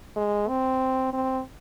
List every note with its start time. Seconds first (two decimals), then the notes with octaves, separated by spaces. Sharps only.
0.16 G#3
0.48 C4
1.13 C4